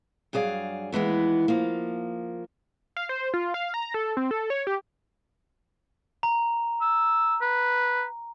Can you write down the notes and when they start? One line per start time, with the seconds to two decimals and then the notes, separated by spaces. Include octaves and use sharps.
0.33 G2 F#3 G#4 D5 F5
0.92 D#2 E3 G#3 B3
1.48 F3 A#3
2.97 F5
3.09 C5
3.34 F4
3.54 F5
3.74 A#5
3.94 A4
4.17 C4
4.31 A4
4.50 C#5
4.67 G4
6.23 A#5
6.81 E6
7.42 B4